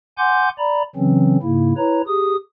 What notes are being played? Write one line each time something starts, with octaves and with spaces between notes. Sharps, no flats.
F#5 G#5 C6 D6 G6
D5 A#5 B5
C#3 E3 F#3 C4 C#4
G#2 C#3 A#3 E4
E4 B4 C#5 A#5
G4 G#4 D#6